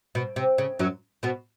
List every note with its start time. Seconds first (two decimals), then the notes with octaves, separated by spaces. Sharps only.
0.15 B2
0.36 C3
0.58 C#3
0.79 F#2 F#3
1.23 B2 B3